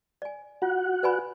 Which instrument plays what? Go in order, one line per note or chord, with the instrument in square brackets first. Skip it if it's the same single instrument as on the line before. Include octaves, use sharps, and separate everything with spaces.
[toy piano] D5 G#5
[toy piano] F4 [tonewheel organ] F#4 F#5
[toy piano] B4 D5 G#5 B5